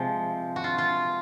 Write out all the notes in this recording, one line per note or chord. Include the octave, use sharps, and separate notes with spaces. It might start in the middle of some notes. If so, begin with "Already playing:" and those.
Already playing: C3 F3 G#3
F#4
F4
F4